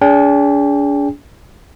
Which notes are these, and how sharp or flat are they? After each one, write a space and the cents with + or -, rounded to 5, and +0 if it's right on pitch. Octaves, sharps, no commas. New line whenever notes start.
D4 -40 G#4 +0 G5 +30